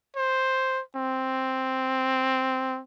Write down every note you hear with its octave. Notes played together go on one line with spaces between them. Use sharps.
C5
C4